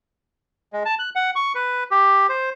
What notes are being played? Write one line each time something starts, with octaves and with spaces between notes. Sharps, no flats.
G#3
A5
F#6
F#5
C#6
B4
G4
C5